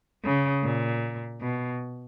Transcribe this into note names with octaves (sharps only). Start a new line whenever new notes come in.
C#3
A#2
B2